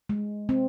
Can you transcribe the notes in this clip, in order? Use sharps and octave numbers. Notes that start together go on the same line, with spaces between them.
G#3
C4